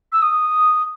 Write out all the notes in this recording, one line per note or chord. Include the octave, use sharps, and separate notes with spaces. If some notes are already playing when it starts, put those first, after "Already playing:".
E6
D#6